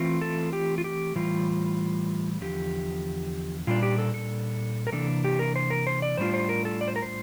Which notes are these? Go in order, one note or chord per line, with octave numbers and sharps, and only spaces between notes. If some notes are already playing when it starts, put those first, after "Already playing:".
Already playing: E3 A3 C4 F4
A4
G4
F4
G4
A2 E3 G3 F4
E2 D3 F3 G4
A#2 G3 D4 F4
G4
A4
A4
A#4
C3 E3 A#3 D4 A4
G4
A#4
C5
A#4
C5
D5
A2 G3 D4 F4 C5
C5
A#4
A4
D5
C5
A#4
C5